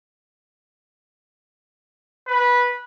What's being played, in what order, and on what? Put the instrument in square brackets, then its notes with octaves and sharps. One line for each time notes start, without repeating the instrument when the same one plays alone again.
[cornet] B4